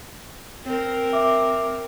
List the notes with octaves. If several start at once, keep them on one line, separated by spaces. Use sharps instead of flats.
C4 A#4
E5 D6